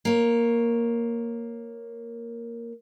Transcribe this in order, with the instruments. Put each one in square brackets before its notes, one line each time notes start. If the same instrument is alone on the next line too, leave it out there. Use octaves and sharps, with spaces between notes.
[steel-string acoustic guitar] A#3 C#5